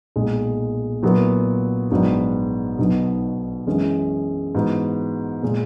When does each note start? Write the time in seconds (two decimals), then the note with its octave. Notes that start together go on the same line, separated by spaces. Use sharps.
0.16 B1 A#2 G#3
1.03 A#2 F#3 B3 E4 A#4
1.91 A#1 G#2 F#3 B3 F#4
2.79 B1 B2 F#3 B3 D#4
3.67 F#2 E3 G#3 C#4
4.55 G#2 E3 B3 F#4 B4
5.43 A#2 G#3